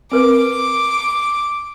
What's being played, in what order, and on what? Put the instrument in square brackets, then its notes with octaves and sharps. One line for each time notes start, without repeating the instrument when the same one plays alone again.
[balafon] C4 A#4 B4 [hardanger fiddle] D6